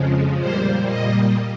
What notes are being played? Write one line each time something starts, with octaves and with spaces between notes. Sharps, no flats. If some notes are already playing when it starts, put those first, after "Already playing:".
Already playing: F2 C#3 F3 G#3
A#2 G3 A#3 C5
D#5